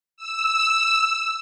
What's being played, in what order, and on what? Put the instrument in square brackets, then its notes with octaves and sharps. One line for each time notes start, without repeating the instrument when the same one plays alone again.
[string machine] E6